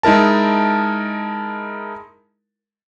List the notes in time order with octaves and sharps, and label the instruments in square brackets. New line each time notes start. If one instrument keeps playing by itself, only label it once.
[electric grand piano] G#3 D#4 E4 A#4 A5